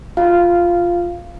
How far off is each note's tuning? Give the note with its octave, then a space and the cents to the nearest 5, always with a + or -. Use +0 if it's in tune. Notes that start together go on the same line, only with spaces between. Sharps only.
F4 +0 F5 -10